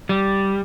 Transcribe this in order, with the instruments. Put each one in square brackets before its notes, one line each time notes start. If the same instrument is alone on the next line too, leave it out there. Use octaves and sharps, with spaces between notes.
[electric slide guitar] G3